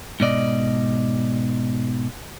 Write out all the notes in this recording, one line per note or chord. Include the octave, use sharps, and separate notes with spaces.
G#2 B2 D5 D#5